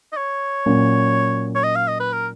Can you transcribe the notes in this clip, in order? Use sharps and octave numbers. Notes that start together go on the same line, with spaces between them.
D#5
C#5
A#2 F#3 C#4
C#5
D#5
F5
D#5
B4
A#4